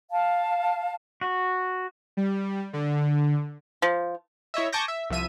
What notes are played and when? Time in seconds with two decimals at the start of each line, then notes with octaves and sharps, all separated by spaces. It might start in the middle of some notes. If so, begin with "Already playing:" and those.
0.11 F5 A5
1.21 F#4
2.17 G3
2.73 D3
3.82 F3
4.54 E4 C#5 D#5 E5
4.73 G#5 A5 C#6 D6 G6 A#6
4.88 E5
5.10 C2 F3 E5 D#7